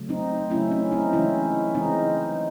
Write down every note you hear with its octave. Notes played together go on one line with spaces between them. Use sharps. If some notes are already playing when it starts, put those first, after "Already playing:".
Already playing: C#3 F#3 A3
C4 D#4
C#3 F#3 A3 C#4 E4
C#4
C4 D#4
C#3 E3 G#3 C#4 E4
C#3 E3 G#3 C4 D#4